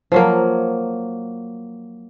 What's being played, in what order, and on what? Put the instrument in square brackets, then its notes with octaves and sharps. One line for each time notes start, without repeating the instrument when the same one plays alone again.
[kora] F3 F#3 A#3